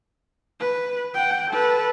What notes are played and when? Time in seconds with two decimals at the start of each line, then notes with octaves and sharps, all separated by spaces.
0.60 B4
1.14 F#5 G5
1.50 A4 B4